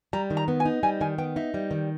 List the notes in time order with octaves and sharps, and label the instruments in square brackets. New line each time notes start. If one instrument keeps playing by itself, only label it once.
[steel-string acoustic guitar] G3 [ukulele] A#5
[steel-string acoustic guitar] D#3
[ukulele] A#5
[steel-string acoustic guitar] B3
[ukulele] G#5
[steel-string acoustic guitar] D#4
[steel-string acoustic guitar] G3 [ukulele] G#5
[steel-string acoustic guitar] D#3 [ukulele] G#5
[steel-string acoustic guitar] B3 [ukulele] G5
[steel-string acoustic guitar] D#4 [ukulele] E5
[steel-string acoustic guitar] G3
D#3